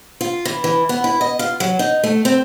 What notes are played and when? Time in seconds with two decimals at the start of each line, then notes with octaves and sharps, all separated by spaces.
0.21 F4
0.45 E3
0.64 E3
0.89 B3
1.04 E4
1.21 D#5
1.39 F4
1.60 F#3
1.79 D#4
2.04 A3
2.25 C4